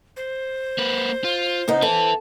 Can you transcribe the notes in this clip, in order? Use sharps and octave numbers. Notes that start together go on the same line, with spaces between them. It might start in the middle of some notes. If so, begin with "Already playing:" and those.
C5
A#3 B4
F4
C#3 B3 D#4
A4 B4 E5